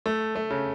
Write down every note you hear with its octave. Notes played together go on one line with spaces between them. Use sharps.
A3
A3
C#3